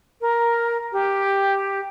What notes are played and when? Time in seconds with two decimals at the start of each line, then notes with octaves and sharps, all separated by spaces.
0.21 A#4
0.92 G4